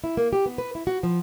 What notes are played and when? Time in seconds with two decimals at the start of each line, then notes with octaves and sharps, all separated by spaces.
0.04 E4
0.17 A#3
0.33 G4
0.46 B3
0.58 B4
0.75 E4
0.87 F#4
1.03 F3